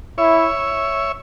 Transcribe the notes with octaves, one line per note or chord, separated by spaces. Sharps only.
E4 C#5 E5